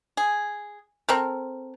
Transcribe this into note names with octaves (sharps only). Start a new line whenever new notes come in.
G#4
C4 A4 A#4